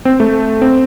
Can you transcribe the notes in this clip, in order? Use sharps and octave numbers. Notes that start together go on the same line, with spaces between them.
C4
A3
C4